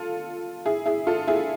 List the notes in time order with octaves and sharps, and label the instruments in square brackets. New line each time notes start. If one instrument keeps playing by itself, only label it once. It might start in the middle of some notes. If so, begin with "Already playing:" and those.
Already playing: [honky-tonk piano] F4 A4
E4 G#4
E4 G#4
F4 A4
E4 G#4